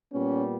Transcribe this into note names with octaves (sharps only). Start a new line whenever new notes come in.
A#2 G3 B3 C#4